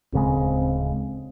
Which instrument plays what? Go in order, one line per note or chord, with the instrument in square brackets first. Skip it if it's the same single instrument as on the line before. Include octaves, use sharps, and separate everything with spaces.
[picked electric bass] D1 C#3 G#3 [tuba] C4